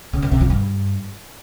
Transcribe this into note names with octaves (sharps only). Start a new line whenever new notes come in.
C#3
F#2
C3
F3
G2